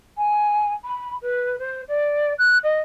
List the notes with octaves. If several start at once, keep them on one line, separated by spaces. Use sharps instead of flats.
G#5
B5
B4
C5
D5
F#6
D#5